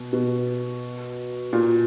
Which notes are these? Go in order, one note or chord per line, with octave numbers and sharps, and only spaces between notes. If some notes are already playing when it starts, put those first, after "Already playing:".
Already playing: B2
B2
A#2